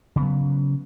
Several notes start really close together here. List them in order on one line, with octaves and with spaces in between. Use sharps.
C#3 B3 F#3